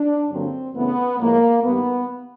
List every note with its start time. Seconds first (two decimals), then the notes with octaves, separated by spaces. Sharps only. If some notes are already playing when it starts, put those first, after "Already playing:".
Already playing: D4
0.31 G2 D3 F#3 A#3 C4
0.75 F#2 C#3 E3 A3 B3
1.19 A2 F3 G#3 A#3
1.63 G2 D#3 G3 B3